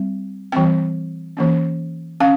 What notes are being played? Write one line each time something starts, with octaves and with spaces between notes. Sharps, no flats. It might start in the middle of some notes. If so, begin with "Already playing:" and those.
Already playing: G3 C4
E3 G3 C4 G5
E3 A#3 C#4
C#4 F5